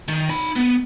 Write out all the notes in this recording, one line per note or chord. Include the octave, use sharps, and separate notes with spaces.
D#3
D#4 B5
B3